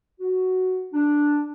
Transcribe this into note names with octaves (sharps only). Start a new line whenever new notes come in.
F#4
D4